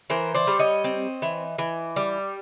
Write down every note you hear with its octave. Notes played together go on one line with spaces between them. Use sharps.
E3 A#4 C5
C5 D5
G3
C#5 D#5
C4
E3
E3
G3